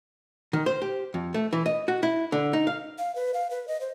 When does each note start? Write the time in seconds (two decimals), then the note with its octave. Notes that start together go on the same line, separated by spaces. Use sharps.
0.53 D#3
0.66 C5
0.82 G4
1.14 F2
1.34 A3
1.53 E3
1.66 D#5
1.88 F#4
2.03 E4
2.32 D3
2.53 D#4
2.67 F5
2.98 F5
3.15 B4
3.34 F5
3.51 B4
3.68 D#5
3.81 C5